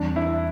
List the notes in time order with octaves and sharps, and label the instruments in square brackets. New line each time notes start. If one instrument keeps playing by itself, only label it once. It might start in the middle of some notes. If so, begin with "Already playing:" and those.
Already playing: [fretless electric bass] E2 E3 G3 C4 [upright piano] D4
[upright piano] E4